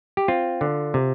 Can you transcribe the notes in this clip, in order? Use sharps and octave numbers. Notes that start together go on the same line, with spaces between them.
G4
C4 F4
D3
C3